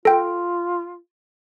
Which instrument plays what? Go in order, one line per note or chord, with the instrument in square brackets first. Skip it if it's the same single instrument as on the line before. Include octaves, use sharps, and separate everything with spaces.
[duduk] F4 [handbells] A4 G5